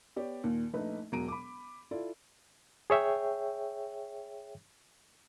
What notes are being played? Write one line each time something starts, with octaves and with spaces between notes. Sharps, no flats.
B3 G4 C#5 D5
D#2 A#2
A#1 A3 D#4 B4
E1 B2 F#3 A#5 D7 D#7
B5 D6
E4 F4 A4 D5
G#4 C#5 E5 G5